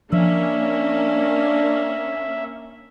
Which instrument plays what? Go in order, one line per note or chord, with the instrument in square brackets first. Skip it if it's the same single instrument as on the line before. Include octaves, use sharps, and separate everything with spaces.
[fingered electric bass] F3 [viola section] A#3 C#4 [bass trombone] D4 [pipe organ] E5